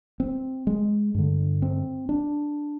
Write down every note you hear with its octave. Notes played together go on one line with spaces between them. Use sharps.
C4
G#3
G2 D3
C4
D4